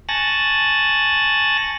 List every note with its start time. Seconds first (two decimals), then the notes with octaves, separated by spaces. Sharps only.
0.09 G#5 A5 C#6 F#6 A6 A#6